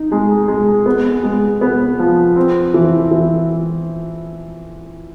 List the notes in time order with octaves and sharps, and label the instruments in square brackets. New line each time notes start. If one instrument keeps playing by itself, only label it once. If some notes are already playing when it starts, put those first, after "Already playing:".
Already playing: [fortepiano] D#4
G#3
G#3
B3
G#3
B3
F3
C4
E3
E3